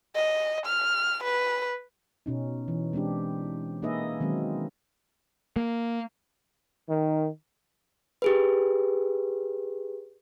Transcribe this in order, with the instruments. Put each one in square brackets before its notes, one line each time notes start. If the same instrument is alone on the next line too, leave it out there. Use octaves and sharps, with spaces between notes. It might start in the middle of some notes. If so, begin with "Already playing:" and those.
[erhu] D#5
F6
B4
[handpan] B2 C#4 D#4
E3
G#3 C4 D4 G4
A#3 D#4 G#4 B4 D#5 E5
D#3 F#3 G#3 C4 C#4
[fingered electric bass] A#3
[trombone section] D#3
[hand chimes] G4 G#4 B4